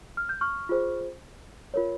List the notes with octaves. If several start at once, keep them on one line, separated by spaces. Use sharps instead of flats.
F6
G6
C#6 F6
F4 G#4 C5
F4 A#4 C#5